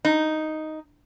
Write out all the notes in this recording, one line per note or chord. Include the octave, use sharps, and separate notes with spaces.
D#4